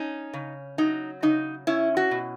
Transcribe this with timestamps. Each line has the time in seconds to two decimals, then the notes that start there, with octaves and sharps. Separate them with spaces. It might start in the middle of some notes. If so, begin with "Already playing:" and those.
Already playing: C#4 D#4
0.34 C#3
0.78 F#3 D#4
1.22 C#3 D#4
1.67 C#4 E4
1.97 F#4
2.11 B2